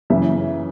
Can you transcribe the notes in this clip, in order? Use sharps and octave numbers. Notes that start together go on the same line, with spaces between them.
F#2 C#3 E3 E5